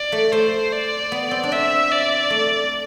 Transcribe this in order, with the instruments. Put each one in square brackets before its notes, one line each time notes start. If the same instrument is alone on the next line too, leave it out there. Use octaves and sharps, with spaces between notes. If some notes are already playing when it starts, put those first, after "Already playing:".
Already playing: [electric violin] D5
[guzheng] A3
[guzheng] A3 [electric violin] C5
[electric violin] D5
[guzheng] B3
C4
D4
[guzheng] C4 [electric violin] E5
[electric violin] D5
[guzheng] A3